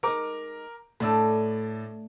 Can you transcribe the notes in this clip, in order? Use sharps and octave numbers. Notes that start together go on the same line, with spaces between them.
G#3 D#4 A#4 D6
A2 A3 D4 D5 E6